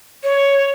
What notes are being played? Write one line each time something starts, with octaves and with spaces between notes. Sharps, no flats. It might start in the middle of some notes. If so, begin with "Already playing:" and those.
C#5